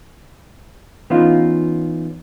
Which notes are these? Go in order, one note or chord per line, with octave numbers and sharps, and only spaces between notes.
E3 B3 C#4 D#4 F4